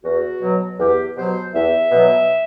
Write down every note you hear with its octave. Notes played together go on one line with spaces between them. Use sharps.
E2 F#4
B2 F#3
E2 G4
B2 F#3 C5
E2 E5
B2 F#3